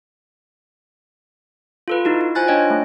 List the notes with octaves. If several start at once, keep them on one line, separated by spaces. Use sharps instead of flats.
F4 A4 B4
D#4 E4 F#4
D#4
F4 C5 G#5 F#6 A6
D4 C#5 D#5 G5
A3